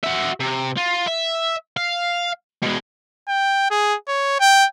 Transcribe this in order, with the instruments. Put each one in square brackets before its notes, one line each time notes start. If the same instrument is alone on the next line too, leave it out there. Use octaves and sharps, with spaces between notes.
[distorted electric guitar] F#4 E5
C3
F4
E5
F5
B2 G#3
[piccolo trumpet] G5
G#4
C#5
G5